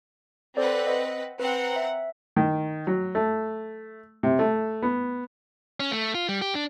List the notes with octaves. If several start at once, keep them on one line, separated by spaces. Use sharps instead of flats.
C4 A4 B4 C5 D5 F#5
D#5
C4 B4 F#5 A#5
E5
D#3
F#3
A3
C3
A3
B3
C#4
A3
F4
G3
G4
D4